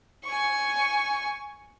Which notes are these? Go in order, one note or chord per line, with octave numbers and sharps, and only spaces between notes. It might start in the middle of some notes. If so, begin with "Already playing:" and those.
G#5 C#6